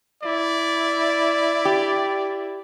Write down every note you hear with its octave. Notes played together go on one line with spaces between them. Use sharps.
E4 D5
G4